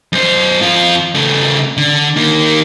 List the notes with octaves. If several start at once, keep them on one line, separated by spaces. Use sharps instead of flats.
F#2 C5
F2 F4
C#3 A3
D3
D#3 A#3